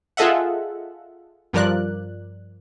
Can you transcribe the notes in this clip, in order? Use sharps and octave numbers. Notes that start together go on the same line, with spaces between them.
F4 G#4 A4 D#5 E5 F#5
G2 F3 A#4 D5 F#6